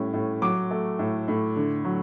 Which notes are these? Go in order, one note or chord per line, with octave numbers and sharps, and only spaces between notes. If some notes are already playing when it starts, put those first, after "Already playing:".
Already playing: A2 G3 C#4
A2
F#3 D6
A3
A2
A2
D3
F#3